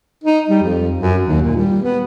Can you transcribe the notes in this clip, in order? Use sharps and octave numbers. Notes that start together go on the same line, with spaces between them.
D#4
G3
F2
F#2
D#2
A#2
G3
B3